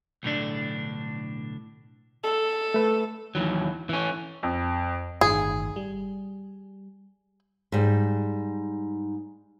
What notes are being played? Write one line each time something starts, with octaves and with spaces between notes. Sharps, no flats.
B1 A2 D3 D4
A4
A3 B4 E5
D#2 G#2 E3 F#3
E3 C#4
F2
G1 A2 D#3 G#4
G3
G#2 G3